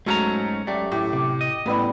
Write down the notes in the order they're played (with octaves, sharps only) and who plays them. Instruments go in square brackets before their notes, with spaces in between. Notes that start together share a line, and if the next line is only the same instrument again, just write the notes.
[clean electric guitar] G#2 C#4 A#5 [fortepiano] F#3 A3 [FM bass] G#3
[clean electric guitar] F#2 A3 [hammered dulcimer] G4 [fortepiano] D5
[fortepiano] A2 [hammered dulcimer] G4
[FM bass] C3 [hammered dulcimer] D6
[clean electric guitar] D#5
[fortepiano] A1 E3 [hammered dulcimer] G3 B3 G4 [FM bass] A3